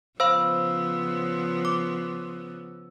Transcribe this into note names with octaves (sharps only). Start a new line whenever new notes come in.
C#3 F3 B3 C5 F5 B5 E6
D6